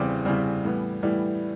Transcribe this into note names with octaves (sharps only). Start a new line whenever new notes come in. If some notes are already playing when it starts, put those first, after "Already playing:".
Already playing: E2 C#3 E3 G3 C4 D6
E2 C#3 E3 G3 C4
A2 E3 G3 B3
A2 E3 G3 B3